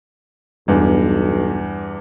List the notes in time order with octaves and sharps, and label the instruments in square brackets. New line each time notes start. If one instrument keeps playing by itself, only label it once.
[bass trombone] B1 [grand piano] E2 G2